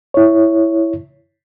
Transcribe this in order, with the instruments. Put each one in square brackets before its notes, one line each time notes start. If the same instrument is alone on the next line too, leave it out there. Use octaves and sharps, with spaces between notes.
[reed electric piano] E4 C#5